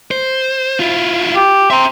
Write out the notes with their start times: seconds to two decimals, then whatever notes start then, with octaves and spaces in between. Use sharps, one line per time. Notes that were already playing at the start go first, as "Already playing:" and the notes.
0.11 C5
0.79 E4 F4
1.36 G4
1.70 C4 E5 A#5